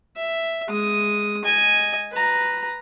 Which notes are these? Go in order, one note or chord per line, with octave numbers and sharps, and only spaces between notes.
E5
G#3 D#6
D#5 G#5
B4 A#5